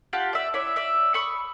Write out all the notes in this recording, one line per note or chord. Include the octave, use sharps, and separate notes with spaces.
F4 G4 F#5 A5
D5 E5
E4 C#5 D5 E5
D5 E5
B5 C#6 D#6